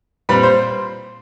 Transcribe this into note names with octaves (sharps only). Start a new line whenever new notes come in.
A#2 G3 C4 B4 B5
C5 C6